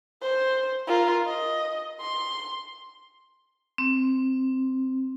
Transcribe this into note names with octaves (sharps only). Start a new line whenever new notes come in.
C5
F4 A#4
D#5
C6
C4